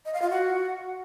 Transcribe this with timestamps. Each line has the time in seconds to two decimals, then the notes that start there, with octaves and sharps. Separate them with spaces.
0.05 D#5
0.13 F5
0.22 F4
0.30 F#4